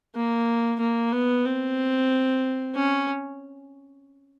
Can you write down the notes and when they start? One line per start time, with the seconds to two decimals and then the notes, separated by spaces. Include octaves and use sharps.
0.15 A#3
0.80 A#3
1.13 B3
1.45 C4
2.75 C#4